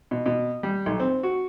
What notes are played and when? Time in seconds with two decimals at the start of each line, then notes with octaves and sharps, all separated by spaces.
0.11 B2
0.26 B2
0.63 G3
0.86 B1
1.00 C4
1.23 F#4